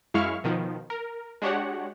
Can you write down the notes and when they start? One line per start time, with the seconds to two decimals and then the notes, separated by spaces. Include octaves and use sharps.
0.14 F#2 G#3 E4 F5 C#6 F6
0.44 B2 D#3 F3
0.90 A#4
1.42 G#3 D4 F#4 G4 C#5 F#5